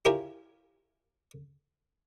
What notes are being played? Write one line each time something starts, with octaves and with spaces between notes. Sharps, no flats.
E4 F4 G4 A#4 C#5 G#5